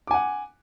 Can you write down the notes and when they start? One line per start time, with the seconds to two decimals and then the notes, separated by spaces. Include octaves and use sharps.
0.07 D6
0.11 G#5
0.14 F#5